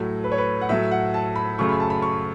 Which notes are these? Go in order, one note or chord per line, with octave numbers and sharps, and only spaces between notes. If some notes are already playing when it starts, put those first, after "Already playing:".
Already playing: A2 F#3 A3
B4
C#5
B4
F#5
A2 F#3 A3 E5
F#5
A5
B5
F#2 C#3 A3 C#6
B5
A5
B5
C#6